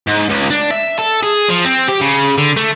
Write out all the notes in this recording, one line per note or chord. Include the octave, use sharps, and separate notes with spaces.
G#2
C#2
D4
E5
A4
G#4
F3
C4
G4
C#3
D3
A3